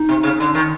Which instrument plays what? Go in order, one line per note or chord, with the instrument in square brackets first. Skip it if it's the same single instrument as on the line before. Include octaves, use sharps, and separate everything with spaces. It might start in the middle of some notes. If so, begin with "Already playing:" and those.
Already playing: [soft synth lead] D#4
[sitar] C3
C#3
D3
D#3